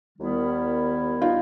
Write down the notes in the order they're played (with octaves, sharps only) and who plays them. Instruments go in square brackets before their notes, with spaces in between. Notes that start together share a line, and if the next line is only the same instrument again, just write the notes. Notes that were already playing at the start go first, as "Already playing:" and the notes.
[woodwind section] D#2 D#3 G3 B3 E4
[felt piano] D#4 F4